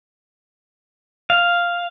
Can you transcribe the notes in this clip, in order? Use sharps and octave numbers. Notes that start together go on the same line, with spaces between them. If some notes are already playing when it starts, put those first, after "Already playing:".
F5